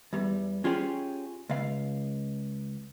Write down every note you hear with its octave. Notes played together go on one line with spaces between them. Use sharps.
E2 G3
C#4 F4 G4 G#4 C#5
C#2 F5